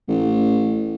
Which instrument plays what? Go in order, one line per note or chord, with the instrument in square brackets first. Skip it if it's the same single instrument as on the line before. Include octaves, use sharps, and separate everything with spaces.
[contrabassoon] A1